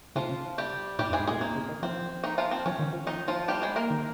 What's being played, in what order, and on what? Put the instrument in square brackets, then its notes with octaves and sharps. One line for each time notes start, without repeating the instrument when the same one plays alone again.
[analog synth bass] C#3 [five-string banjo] F3 F4
[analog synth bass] C#3
[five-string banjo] G3 G4
[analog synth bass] A#2 [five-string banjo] G3 G4
[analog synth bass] F2
[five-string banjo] G#3 G#4
[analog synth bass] G#2
[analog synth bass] A#2 [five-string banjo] G#3 G#4
[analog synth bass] C3 [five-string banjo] A#3
[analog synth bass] C#3
D#3
[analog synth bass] F3 [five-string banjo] C4
[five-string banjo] D#3 D#4
F3 F4
C4
[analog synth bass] F3 [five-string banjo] C#4
[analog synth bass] D#3
F3
[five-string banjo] D#3 D#4
F3 F4
G3 G4
G#3 G#4
A#3 A#4
[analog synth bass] D#3